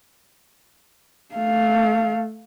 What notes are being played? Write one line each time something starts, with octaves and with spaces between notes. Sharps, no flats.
A3 F5